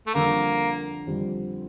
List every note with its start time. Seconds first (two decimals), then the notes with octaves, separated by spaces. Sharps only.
0.07 A3
0.14 F2 D3 G3 A#3
1.07 F2 D3 G3